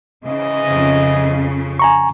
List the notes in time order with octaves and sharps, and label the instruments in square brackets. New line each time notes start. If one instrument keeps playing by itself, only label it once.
[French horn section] G#2 E3 D#5 [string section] C#3
[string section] F2 C#3
[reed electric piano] G#5 A#5 C#6